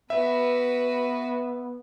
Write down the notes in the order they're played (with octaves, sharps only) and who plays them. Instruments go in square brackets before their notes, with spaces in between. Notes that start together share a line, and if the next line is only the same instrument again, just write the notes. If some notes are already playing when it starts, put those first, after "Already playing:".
[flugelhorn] B3 [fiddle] F#4 B4 [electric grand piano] E5